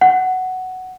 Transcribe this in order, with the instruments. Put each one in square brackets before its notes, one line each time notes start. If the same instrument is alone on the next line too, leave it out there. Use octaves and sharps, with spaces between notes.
[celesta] F#5